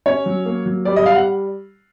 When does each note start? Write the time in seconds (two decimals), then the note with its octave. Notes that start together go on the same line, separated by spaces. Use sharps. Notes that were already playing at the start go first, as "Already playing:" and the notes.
0.06 C#4 C#5
0.26 F#3
0.46 A#3
0.66 F#3
0.85 G3 D5
0.96 D#5
1.06 G3 F5
1.15 F#5